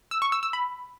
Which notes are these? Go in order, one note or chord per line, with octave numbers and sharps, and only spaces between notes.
E6
C#6
E6
E6
B5